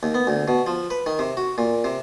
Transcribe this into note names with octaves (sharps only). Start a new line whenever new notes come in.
D#2
B3
D2
B2
F3
B4
D#3
C3
F#4
A#2
C3